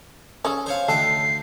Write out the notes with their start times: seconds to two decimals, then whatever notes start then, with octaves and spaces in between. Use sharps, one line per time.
0.45 C#4 G#4 A4
0.66 C5 C#5 F5
0.88 D2 A4 D#5 G5 C7